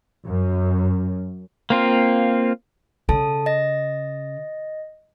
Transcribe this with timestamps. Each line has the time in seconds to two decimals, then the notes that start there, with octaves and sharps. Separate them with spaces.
0.24 F#2
1.70 A#3 C4 F4
3.09 C#3 A4 A5
3.46 D#5 A#6